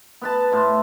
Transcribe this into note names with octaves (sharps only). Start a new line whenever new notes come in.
B3 B4 A5
A2 C6